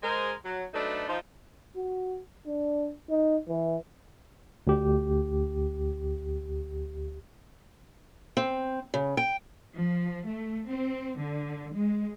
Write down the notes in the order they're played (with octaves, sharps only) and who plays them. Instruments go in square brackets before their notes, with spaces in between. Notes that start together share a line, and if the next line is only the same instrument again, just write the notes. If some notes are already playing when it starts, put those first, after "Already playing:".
[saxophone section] G#3 A#4 C5
F#3
F#3 A3 D4 D#4 A4 B4
F3 D#4
[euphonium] F#4
D4
D#4
E3
[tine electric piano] D2 G4
[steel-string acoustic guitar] C4
C#3
G5
[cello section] F3
A3
C4
D3
G#3